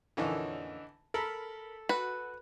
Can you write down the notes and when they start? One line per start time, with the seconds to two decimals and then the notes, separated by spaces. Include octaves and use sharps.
0.17 F2 A#2 D3 E3 C#4 D#4
1.14 A4 A#4 B5
1.89 F#4 B4